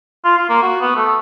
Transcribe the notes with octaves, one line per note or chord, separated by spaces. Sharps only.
F4
F4
A#3
F#4
B3
A3